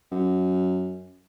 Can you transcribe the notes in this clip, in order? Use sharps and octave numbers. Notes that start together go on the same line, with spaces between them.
F#2